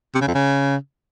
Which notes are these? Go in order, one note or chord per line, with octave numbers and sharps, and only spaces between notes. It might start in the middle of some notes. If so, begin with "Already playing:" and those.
C3
C#3
F2
C#3